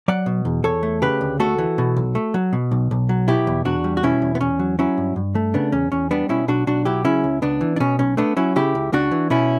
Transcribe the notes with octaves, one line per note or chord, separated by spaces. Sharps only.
F#3 D5 F#5
B2
E2
E2 A4 C#5
A3
C#3 G4 B4
D2
A3 F#4 A4
E3
B2
B1
A3
F#3
B2
B1
B1
F#3
B2 E4 G4
E2
E2 D4 F#4
G3
F#4
B2 C#4 E4
E2
B3
E2 C#4
F#3
F#3 C#4 E4
G2
G2
A3
C#3 B3 D4
E2 C#4
E2 C#4
G3 B3 D4
B2 C#4 E4
B1 D4 F#4
B1 D4 F#4
F#3 E4 G4
C#3 C#4 E4
C#2
C#2 B3 D4
E3
D4
B2 C#4
B1 C#4
A3 B3 D4
F#3 C#4 E4
C#3 E4 G4
C#2
C#2 D4 F#4
E3
B2 C#4 E4